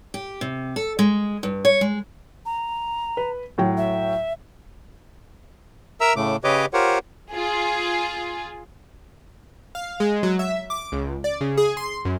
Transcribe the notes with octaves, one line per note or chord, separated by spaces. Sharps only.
G4
C3
A4
G#3
G2
C#5
G#3
A#5
B4
A2 F#3 G5
E5
A#4 E5 A#5 E6
A2 C#3 A3 D6
C#3 G4 B4 C#5 D#5 D6
F4 G4 A#4 C5 C#5 F#5
F4 G#4
F5
G#3
F#3
E5
D6
C#2
D5
C#3
G#4
C6
F#2